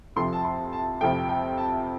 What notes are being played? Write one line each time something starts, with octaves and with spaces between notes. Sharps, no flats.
F2 C3 F3 A3 C6
A5
C6
A5
F2 C3 F3 A3 G5
G5
A5